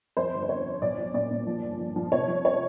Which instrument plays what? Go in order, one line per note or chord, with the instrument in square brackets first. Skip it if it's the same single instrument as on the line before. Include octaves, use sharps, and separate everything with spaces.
[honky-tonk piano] F2 C5
G1
C5
G1 C#5
G1
B1 D5
F3
A#2 D5
A#2
F3
G1
F3
F3
C3 C#5
F3
C#5